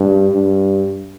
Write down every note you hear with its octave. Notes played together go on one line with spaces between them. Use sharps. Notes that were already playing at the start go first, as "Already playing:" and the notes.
Already playing: G2
G2